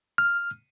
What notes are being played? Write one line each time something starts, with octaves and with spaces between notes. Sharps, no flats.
F6